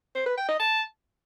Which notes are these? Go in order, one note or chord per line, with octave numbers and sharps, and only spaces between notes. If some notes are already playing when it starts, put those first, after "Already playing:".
C5
B4
G5
D#5
A5